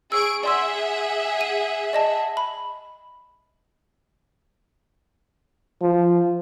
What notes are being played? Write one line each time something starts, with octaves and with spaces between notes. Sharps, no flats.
G#4 C#6 E6 D7
G#4 D5 E5 F#5 C6 E6
D#7
D5 D#5 A5
B5
F3